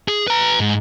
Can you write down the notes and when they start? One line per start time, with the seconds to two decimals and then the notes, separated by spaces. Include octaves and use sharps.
0.08 G#4
0.28 B4 A#5
0.60 G#2